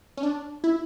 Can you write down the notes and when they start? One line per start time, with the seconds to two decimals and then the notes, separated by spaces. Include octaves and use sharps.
0.17 C#4
0.23 D4
0.64 E4